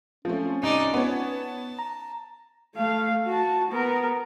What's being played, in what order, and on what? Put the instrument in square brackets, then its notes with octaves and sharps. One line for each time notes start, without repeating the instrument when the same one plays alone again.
[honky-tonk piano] F3 A3 [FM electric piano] C4 F4 [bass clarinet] C#4
[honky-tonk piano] C2 [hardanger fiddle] D#4 D5
[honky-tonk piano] B3 C#5 [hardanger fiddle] A5
[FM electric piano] A#5
[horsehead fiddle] A3 F5
F#4 A5
B3 A#4